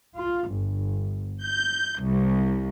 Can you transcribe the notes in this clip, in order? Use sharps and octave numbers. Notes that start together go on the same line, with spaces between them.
F4
G1
G6
C2